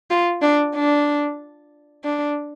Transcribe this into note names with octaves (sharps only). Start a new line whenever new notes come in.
F4
D4
D4
D4